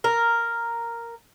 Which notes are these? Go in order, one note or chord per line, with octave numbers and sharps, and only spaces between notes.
A#4